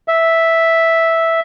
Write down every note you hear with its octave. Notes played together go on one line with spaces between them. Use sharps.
E5